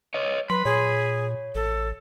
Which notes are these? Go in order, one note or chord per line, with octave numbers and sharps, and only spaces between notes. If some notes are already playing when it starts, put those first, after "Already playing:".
C#5 D#5
F#3 B4 B5 C6
A#2 G#4 C#5
A1 A4